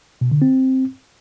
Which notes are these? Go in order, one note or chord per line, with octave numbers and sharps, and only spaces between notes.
B2
D3
C4